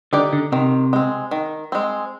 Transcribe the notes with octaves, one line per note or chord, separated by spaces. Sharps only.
D3 D#4 G4 D5
D3
C3 D#3
G#3 C4
D#3
G#3 C4